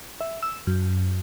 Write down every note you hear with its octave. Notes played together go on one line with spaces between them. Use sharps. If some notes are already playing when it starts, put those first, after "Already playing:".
E5
E6
F#2